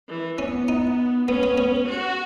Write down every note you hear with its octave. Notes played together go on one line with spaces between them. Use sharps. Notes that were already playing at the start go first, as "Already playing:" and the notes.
E3
B3 C#4
D#4
B3 C#4
B3
B3
F#4